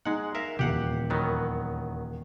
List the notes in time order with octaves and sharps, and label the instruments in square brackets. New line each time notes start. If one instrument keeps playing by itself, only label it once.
[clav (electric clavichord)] G#3 F#5 [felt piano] D#4
[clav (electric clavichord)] A#4 E5 F5
[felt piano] D#1 E2 C7 [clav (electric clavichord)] G4 F#5
[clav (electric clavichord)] D#3 F#3 B3